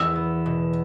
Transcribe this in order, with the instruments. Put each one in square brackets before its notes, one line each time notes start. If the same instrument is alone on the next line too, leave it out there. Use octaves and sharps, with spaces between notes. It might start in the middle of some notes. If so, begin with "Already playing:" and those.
Already playing: [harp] E2 [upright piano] E6
[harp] B3
B2